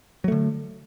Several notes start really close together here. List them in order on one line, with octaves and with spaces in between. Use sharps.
F#3 A3 D3